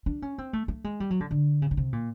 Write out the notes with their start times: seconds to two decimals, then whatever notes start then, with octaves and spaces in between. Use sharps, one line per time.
0.06 D4
0.22 C#4
0.38 C4
0.53 A3
0.68 A3
0.84 G#3
1.00 G3
1.10 F#3
1.20 D3
1.31 D3
1.62 C#3
1.71 B2
1.77 C3
1.93 A#2